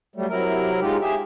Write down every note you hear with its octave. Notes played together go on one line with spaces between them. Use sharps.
F#3 G3 A3
C3 F#3 E4 A#4
G#3 D#4 F4 G4
G4 G#4 E5